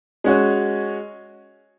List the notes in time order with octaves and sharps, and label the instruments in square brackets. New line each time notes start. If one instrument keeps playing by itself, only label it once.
[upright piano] G#3 C#4 F#4 C#5